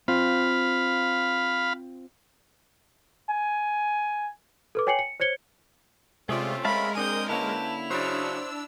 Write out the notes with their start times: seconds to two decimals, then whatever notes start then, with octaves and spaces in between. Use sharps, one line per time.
0.08 C4 F4 F5 B5
3.30 G#5
4.75 A4 B4 D6
4.87 C#5 G5 G#5 C7 C#7 F#7
4.99 C#7
5.20 C5 C#5 G#6 C#7 G7
6.29 C3 G#3 A3 C4 C#4 F4 G#4 D5
6.65 G#3 A#4 E5 F5 A5 B5
6.95 C4 D4 G#4 D#6 G6
7.30 D3 A#3 C#4 E4 B4 G5 A5 F7
7.91 C#3 F#3 D4 C5 D5 E6